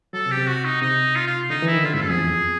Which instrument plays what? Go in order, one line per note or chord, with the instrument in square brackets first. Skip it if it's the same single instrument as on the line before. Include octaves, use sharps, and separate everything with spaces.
[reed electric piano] F#3 [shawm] A4
[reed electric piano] C3
[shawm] G4
[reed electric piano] C3
[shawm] F#4
D#4
[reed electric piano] C3 [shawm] D#4
[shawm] F4
F4
[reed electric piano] D3 [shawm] D#4
[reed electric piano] E3
[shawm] E4
[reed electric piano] D#3
[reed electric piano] D3 [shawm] F4
[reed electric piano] G#2 [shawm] E4
[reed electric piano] F#2 [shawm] A4
[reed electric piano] F2 [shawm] G#4
[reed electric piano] E2
F2